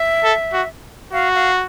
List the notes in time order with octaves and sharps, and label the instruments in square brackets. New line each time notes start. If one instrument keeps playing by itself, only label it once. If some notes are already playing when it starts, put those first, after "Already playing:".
Already playing: [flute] E5
[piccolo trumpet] A4
F#4
[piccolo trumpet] F#4 [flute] F5
[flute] F5